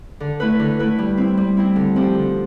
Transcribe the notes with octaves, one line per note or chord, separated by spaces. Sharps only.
D3
A3 E4 B4
D3
A3 E4 B4
G3
C4 E4
G3
C4 E4
D3
F3 C4 G4
D3